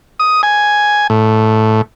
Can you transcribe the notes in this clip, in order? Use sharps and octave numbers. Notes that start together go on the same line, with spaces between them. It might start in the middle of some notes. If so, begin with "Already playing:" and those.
D#6
G#5
A2